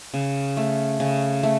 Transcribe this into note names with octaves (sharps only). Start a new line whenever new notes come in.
C#3
A3
C#3
A3